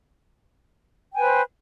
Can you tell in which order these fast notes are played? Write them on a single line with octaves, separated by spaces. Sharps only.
G5 G#5 B4 C5